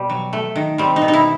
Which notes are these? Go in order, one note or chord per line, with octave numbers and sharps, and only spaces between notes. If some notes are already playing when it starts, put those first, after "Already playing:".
Already playing: B2 G3
F#3
A3
D#3
G3 C4
D#4
B2
D#4
E4